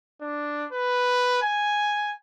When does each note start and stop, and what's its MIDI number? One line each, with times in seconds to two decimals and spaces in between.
0.22 0.66 62
0.72 1.39 71
1.42 2.13 80